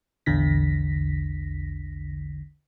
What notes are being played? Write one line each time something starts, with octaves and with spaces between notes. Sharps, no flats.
A#1 E2 D3 A#6 B6